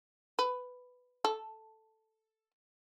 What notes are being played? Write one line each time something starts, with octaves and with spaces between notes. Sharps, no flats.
B4
A4